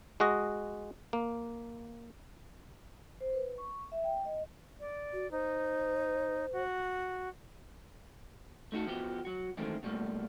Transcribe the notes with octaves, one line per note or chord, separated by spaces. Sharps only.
G#3 F#4 D#5
A#3
C5
B4
C#6
E5
G5
D#5
D5
F#4
D#4 C5
F#4
A3 D#4 F#4 A4
F3 B3 F#4 G4
F#3 F#4
F#2 D#3 E3 G#3 A3 C4
B2 G3 A3 A#3